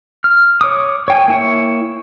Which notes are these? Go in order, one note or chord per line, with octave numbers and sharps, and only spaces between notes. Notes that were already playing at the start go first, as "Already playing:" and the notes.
F6
C#5 D6 D#6
C#5 G5 G#5
A#3 E4 C#5